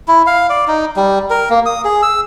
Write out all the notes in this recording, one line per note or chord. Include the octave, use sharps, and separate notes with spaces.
E4
F5
D5
D#4
G3
A#4
A#3
D#6
G#4
E6